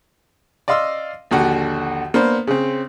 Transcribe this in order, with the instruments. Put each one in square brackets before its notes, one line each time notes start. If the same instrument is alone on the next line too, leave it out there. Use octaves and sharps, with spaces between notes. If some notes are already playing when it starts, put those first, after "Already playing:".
[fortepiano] D5 D#5 F5 C6 E6
A#1 D#2 D3 F#4 F#5
A#3 B3 D4 C5
C#3 C4